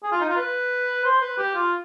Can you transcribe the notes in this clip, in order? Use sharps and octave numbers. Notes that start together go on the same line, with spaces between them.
G#4
F4
D#4
F4
B4
C5
B4
G4
F4